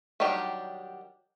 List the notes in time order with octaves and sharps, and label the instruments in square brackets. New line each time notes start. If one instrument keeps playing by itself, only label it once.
[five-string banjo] D#3 F#3 G3 D4 G4